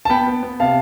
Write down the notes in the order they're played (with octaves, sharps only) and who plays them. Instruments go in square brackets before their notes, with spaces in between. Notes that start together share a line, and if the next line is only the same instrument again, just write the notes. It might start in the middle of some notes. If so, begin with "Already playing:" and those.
[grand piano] A5
B3 G5 B5
B3
B3
C3 F5 A5